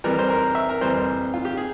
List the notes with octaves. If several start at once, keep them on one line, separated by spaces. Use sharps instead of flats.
F2 E3 G3 A#4
C5
A#4
E5
A#4
F2 E3 G3 C5
F4
G4
G#4